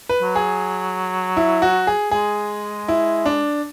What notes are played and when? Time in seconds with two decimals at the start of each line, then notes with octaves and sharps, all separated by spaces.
0.09 B4
0.22 F#3
0.36 G#4
1.37 E4
1.62 F#4
1.87 G#4
2.11 G#3 G#4
2.88 E4
3.26 D4